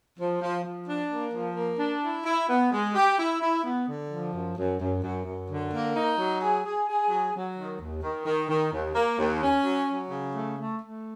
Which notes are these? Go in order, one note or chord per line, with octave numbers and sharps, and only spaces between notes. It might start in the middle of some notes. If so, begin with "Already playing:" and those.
F3
F3
F3
D4
A#3
F3
A#3
D4
E4
E4
B3
G#3
G4
E4
E4
B3
D3
F3
F#2
F#2
F#2
F#2
F#2
D3
A#3
D#4
F#3
G#4
G#4
G#4
F#3
F#3
D#3
D#2
D#3
D#3
D#3
D#2
A#3
D#2
C#4
F#3
F#3
C#3
A3
A3
A3